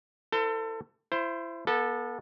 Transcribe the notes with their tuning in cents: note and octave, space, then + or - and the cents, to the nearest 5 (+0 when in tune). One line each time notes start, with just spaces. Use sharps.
E4 +0 A4 +30 C5 -35
E4 +30 C5 +0
B3 -40 A4 -5